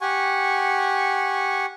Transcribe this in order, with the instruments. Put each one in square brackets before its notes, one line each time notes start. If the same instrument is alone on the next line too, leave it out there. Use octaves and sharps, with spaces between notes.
[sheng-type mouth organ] G4 F#5 G#5 C#6